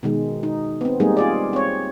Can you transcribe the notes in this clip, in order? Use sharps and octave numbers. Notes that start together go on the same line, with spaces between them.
B2 D#3 G#3
D#4
B3 C4
G3 G#3 A#3 C4 D#4 G#4
F4 G#4 D5
C4 C#5